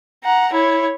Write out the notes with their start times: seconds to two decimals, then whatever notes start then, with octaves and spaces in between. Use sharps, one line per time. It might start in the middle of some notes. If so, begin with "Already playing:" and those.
0.24 F#5 A#5
0.53 E4 C#5